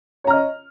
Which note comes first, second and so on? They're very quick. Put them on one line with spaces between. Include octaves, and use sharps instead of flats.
C#5 A#5 F6 D#5